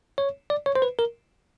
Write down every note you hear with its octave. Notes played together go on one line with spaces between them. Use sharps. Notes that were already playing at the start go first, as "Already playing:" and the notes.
C#5
D5
C#5
C5
B4
A#4